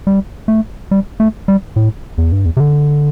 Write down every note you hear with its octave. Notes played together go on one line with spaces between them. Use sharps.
G3
A3
G3
A3
G3
A2
E2
G2
E2
C3
D3